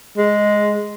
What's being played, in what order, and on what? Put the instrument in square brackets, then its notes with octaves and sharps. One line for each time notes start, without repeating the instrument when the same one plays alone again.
[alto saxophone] G#3